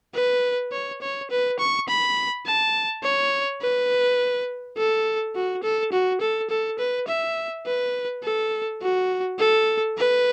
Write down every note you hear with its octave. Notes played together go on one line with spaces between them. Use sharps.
B4
C#5
C#5
B4
C#6
B5
A5
C#5
B4
A4
F#4
A4
F#4
A4
A4
B4
E5
B4
A4
F#4
A4
B4